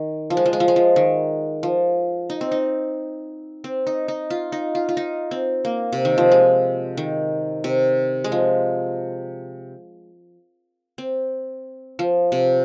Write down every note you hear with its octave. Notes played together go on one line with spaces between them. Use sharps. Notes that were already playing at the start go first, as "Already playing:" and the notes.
Already playing: D#3
F3
G#3
F3
G#3
F3
G#3
F3
D#3
F3
D#4
C4
D#4
C4
D#4
D#4
F4
D#4
F4
F4
D#4
C4
A#3
C3
D#3
F3
G#3
D#3
C3
G#3
F3
C4
F3
C3